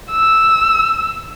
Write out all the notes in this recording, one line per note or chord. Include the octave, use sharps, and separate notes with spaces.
E6